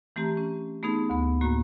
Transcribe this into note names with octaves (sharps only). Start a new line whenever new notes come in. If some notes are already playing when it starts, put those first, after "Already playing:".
E3 A3 C4 G4 A#5
C#4
A3 B3 C4 D#4 G#4
D2 B3
A2 A#3 F#4